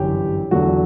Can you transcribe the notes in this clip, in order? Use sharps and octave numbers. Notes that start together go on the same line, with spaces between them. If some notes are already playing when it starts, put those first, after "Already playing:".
Already playing: G1 F#2 E3 G4
E2 D3 F#3 A3 F#4